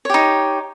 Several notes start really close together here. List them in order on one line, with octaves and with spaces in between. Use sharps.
C#5 G4 D#4